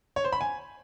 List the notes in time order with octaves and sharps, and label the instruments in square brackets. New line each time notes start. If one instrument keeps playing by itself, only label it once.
[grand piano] C#5
C5
B5
G#5